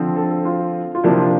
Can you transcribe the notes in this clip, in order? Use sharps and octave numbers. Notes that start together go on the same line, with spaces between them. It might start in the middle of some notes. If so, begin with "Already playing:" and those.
Already playing: D3 F3 C4
A4
A4
F4
F4
C3 F3 A#3 D4 E4
F4